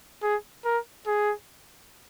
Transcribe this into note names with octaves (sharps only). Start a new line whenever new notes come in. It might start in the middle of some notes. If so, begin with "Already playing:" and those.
G#4
A#4
G#4